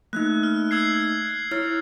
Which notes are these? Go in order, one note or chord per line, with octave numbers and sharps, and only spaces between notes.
A3 A#3 D#4 F#6
F6
E6 G#6 C7
E4 C#5 F6